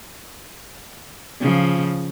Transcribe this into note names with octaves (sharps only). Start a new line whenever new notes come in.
C#3 F3